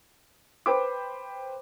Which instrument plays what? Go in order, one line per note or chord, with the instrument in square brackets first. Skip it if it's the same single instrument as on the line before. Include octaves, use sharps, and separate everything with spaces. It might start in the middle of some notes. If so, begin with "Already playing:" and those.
[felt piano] B4 C5 G5 B5 D6